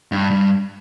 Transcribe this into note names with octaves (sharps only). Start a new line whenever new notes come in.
G2
G2